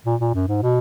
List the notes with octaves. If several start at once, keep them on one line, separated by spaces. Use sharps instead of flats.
A#2
A#2
F#2
G#2
B2